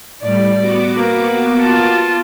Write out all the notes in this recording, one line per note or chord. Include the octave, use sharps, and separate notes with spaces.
A2 G3 D5
B3 F#4 D6
A#3
F4 A5